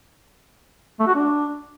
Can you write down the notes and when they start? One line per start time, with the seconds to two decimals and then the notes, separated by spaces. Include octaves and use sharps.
1.00 A3
1.07 F#4
1.15 D4